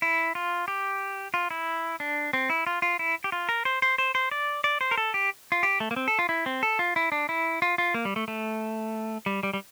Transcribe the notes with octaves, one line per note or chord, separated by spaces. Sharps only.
E4
F4
G4
F4
E4
D4
C4
E4
F4
F4
E4
G4
F4
A#4
C5
C5
C5
C5
D5
D5
C5
A#4
A4
G4
F4
G4
A3
A#3
C4
A4
F4
E4
C4
A4
F4
E4
D4
E4
F4
F4
A#3
G3
A3
A3
G3
G3
G3